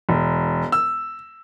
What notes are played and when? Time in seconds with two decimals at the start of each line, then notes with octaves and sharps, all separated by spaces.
0.09 E1
0.72 E6